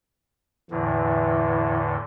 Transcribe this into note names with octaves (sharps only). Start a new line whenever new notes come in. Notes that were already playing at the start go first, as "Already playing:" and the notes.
E2 A2 D3 E3